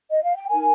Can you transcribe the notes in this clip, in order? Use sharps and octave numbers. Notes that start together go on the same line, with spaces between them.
D#5
F5
G5
D#4 A#4 G#5